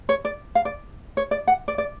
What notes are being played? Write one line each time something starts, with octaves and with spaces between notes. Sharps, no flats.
C#5
D5
F5
D5
C#5
D5
F#5
D5
D5